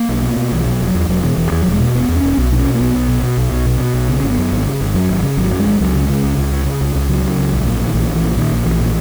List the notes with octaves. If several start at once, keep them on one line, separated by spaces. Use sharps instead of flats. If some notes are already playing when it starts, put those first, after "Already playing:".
Already playing: A#3
B1
B2
B2
B1 E3
B2 F#3
E1
F#3
E2
E1 F#3
B2 E3
E1 E3
E2 E3
E1 F#3
G#3
B2 A#3
E1 B3
E2
C#4
E1
B1 B3
B2 B3
C#4
B2
A#3
B1 B3
B1
B2
B2
B1
B1
B2
B2
B1
C#3 B3
G#1 C#4
B3
F#2
G#1
C#3
G#1
F#2 F#3
G#1
C#3
G#1 F#3
F#2
G#3
G#1
C#2 F#3
C#3
G#3
C#3
C#2
C#2
C#3
C#3
C#2
C#2
C#3 F#3
C#3
C#2
A#1
A#2
A#2
D#3
A#1 E3
A#1
E3
A#2
A#2 D#3
A#1
A#1 E3
A#2